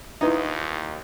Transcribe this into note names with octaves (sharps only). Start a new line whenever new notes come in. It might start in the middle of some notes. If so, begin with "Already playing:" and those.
D#2 D#4 E4 B4 E5